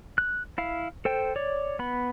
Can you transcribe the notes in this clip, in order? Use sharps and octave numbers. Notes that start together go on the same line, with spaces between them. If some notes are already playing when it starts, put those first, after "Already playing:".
F#6
E4 F5
A4 C5 G5
C#5 D5
B3 B5